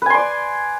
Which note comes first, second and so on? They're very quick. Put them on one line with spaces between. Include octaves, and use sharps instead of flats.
B4 G#5 C6 D5